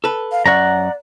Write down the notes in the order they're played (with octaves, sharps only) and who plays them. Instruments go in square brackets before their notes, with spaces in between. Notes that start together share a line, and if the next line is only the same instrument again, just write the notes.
[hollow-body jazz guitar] A4 B4
[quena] F5
[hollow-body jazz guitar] F#2 C#5 [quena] D5 [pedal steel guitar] F#5 A#5